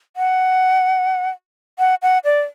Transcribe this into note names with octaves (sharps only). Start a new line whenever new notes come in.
F#5
F#5
F#5
D5